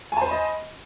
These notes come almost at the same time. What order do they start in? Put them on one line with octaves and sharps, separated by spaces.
G#5 A5 C5 B5 D#5